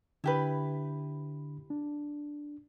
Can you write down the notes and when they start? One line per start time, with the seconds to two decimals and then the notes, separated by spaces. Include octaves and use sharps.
0.24 D3 D4 E4 G4 B4 B5
1.70 D4